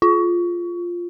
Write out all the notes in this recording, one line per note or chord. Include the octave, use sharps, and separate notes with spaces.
F4